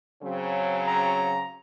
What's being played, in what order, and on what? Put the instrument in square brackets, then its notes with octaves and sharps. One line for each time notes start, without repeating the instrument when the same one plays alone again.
[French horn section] C#3 F#3 C4
[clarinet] A#5